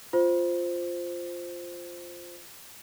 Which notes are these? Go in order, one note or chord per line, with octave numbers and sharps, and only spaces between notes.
F4 C5